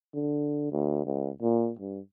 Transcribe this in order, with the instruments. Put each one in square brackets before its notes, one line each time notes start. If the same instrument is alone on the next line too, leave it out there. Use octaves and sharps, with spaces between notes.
[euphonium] D3
D2
C#2
A#2
G2